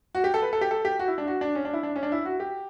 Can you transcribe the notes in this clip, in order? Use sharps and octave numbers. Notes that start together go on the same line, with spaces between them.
F#4
G4
A4
B4
A4
G4
A4
G4
F#4
E4
D4
F#4
D4
C#4
D4
E4
D4
C#4
D4
E4
F#4
G4